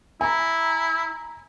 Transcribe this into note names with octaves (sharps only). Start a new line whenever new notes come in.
E4 G#5 A#5